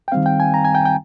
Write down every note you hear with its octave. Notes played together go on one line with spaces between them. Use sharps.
G5
D#3 G3 C4 F5
G5
G#5
A#5
G#5
G5
G5